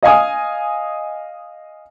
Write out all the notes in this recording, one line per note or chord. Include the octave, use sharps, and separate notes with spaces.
D#5 F5 G#5 D#6